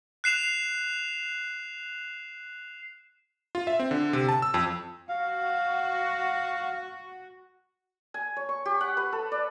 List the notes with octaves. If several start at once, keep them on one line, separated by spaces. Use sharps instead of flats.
F#6 C7 E7 F7
F4
E5
C4
D3
C3
A5
E6
F2
F#4 F5
G#5
C#5
C#6
G4
F#5
B4
A4
D5